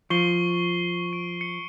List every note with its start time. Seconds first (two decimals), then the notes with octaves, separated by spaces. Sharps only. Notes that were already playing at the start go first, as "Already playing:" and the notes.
0.10 F3 C#6 C7 G7
1.13 D7
1.41 C#7